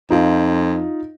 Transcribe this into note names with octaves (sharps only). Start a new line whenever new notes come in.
F2 D#4 F4